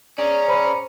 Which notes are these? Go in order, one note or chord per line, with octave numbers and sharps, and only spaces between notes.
C#4 G#4 D5 A#5
C5 B5